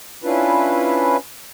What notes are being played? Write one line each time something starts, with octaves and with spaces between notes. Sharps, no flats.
C#4 D4 E4 F4 B4